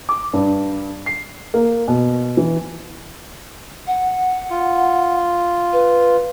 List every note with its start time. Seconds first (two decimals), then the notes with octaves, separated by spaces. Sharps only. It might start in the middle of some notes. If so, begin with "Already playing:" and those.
0.09 D6
0.33 G2
1.06 C7
1.54 A#3
1.88 B2
2.37 E3
3.87 F#5
4.50 F4
5.73 B4